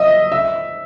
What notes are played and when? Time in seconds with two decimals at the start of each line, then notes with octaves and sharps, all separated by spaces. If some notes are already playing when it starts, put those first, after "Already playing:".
Already playing: D#5 E5
0.32 E5